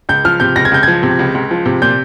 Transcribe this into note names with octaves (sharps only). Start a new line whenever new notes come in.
C#2 G6
F3 F6
C3 G6
C#2 A#6
G#6
C#2 G6
F3 G#6
C3
C#2
C#2
F3
C3
A#2 G6